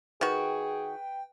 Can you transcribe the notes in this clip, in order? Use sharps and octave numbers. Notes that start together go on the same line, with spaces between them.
D#3 F#4 G#4 B4 G5